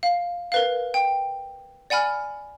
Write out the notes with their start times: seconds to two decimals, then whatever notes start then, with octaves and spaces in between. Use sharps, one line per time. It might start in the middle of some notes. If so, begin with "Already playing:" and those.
0.03 F5
0.52 A#4 B4 F5
0.94 G5
1.90 D5 F#5 G#5 B5 F6